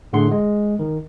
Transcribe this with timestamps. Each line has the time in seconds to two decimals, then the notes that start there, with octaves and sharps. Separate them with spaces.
0.13 A2 D3 G#4 F#5 C6
0.31 G#3
0.79 D#3